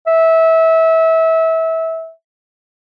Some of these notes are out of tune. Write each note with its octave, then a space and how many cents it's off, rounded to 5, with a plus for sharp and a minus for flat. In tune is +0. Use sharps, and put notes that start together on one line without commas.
E5 -25